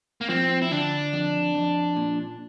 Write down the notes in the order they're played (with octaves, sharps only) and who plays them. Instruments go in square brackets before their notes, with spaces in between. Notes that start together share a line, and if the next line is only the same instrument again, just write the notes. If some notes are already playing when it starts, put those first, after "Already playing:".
[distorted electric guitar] A#3
[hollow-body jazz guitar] F3 [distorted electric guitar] C4
[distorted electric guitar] E4
[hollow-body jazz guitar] D3 [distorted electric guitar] D4
[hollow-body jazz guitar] F2
F2
A#2